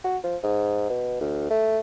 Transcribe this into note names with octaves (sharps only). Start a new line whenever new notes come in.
F#4
F3
G#2
B2
D2
A3